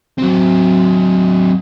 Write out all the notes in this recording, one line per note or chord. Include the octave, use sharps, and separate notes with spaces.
F#3 C4